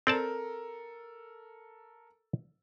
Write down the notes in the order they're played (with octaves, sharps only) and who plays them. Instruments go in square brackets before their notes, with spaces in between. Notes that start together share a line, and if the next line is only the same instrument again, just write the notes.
[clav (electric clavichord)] C4 D5 A5 [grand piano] A4 A#4